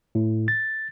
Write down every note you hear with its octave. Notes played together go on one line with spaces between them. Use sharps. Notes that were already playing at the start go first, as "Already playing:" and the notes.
A2
A6